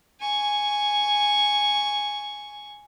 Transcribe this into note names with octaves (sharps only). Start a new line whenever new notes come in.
G#5 C#6